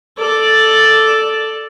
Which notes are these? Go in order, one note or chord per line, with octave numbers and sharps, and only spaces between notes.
A4 D5